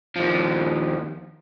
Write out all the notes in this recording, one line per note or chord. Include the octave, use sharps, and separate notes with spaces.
D#2 F3